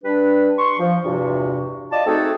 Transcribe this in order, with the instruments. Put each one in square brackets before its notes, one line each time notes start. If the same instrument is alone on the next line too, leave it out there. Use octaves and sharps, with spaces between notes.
[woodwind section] G3 D4 B4
C6 C#6
F3
E2 G2 C3 F4 F#4
F4 D5 D#5 A5
A3 C4 D#4 F#4 G#4 A4